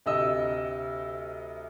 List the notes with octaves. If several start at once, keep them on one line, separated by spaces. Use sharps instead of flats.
D2 C3 D#5 E6